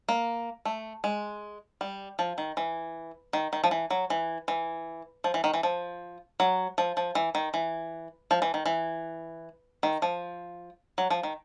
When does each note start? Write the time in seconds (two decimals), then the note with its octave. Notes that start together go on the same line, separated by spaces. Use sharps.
0.09 A#3
0.65 A3
1.04 G#3
1.81 G3
2.19 F3
2.38 D#3
2.57 E3
3.33 D#3
3.53 D#3
3.64 F3
3.71 E3
3.90 F#3
4.10 E3
4.48 E3
5.24 F3
5.34 E3
5.44 D#3
5.54 E3
5.63 F3
6.40 F#3
6.78 F3
6.97 F3
7.15 E3
7.35 D#3
7.54 E3
8.31 F3
8.42 E3
8.54 D#3
8.66 E3
9.83 D#3
10.02 F3
10.98 F#3
11.10 F3
11.23 D#3